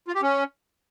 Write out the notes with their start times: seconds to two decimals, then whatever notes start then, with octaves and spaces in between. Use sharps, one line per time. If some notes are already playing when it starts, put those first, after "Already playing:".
0.08 F4
0.15 G4
0.22 C#4